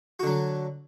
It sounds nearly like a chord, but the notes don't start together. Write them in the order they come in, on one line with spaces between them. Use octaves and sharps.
F#4 D3 F#3